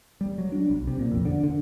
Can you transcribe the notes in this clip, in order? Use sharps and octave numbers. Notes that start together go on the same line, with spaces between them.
G3
F#3
D4
B1
C3
A#2
F2
D3
D3